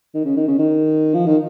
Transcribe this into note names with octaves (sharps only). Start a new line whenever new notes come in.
D#3
C#3
D#3
C#3
D#3
F3
D#3